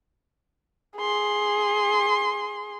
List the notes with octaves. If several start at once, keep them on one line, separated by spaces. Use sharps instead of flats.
G#4 C6